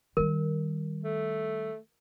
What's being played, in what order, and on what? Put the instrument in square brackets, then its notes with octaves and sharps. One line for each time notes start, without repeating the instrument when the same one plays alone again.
[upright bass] D#3 G3 [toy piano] A#4
[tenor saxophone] A3